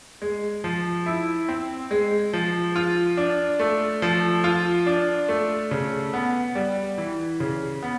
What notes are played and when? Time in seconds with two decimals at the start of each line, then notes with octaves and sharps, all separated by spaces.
0.22 G#3
0.64 F3
1.06 E4
1.49 C4
1.91 G#3
2.33 F3
2.76 F4
3.17 D4
3.59 A3
4.02 F3
4.44 F4
4.86 D4
5.29 A3
5.71 C#3
6.14 B3
6.55 G3
6.98 E3
7.40 C#3
7.83 B3